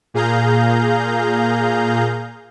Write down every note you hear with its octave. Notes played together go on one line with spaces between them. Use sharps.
A#2 G#4 F5 A#5 G6